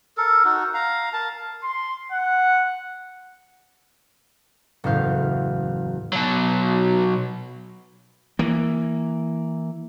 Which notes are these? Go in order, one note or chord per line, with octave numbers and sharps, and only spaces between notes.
A4 A#4
D#4 F#4
F5 A#5
A#4 A5
C6
F#5
F#1 E2 A2 F5 G6
B2 F#3
E3 A#3